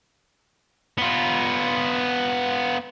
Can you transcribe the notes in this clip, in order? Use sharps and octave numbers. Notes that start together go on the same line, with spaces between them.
B3 F4